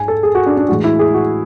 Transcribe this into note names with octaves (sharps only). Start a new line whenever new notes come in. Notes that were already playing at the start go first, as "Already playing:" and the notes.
Already playing: G#2 G#3 G#5
A4
G#4
F#4
D4
D4
A2 E3 G#3 F#4
E4
G#4
F#4